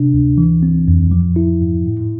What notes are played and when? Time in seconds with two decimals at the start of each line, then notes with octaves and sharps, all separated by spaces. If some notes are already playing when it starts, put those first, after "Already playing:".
Already playing: C3 D4
0.13 D2
0.38 E3
0.63 C4
0.88 F2
1.11 F3
1.36 E4
1.61 G#2
1.86 A2